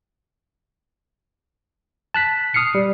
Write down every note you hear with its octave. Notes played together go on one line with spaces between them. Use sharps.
A5 F#6 B6
D#6 F6 C7 C#7
G3